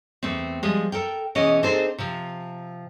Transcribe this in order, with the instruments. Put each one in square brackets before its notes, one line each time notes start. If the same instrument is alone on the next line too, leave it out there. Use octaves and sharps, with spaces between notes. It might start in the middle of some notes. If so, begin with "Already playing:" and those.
[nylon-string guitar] E2 A3 C4
F3 G3 G#3
A4 A#4 G5
B2 E3 C#4 G#4 D#5
C4 D4 D#4 G#4 A4 C5
C3 F3